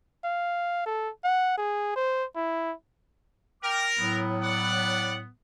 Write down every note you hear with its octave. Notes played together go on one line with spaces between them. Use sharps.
F5
A4
F#5
G#4
C5
E4
A#4 G5 D6 F6
A2 F#3 B3
D5 F#5